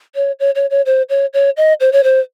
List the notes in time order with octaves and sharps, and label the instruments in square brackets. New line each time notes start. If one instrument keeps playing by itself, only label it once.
[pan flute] C#5
C#5
C#5
C#5
C5
C#5
C#5
D#5
C5
C#5
C5